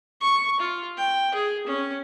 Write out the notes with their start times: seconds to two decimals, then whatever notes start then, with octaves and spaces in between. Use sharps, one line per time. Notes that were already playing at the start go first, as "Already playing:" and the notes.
0.21 C#6
0.60 F4
0.98 G5
1.35 G#4
1.67 C#4